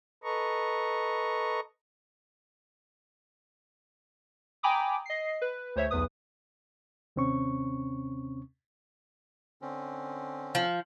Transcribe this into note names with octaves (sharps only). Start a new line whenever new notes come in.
A4 B4 D#5 A#5 C#6
G5 G#5 A#5 B5 D6 D#6
D#5 C7
B4
D2 C5 C#5 E5
B1 E2 B4 D#6
D#2 C3 C4 C#4 C#6
D3 C4 C#4
F3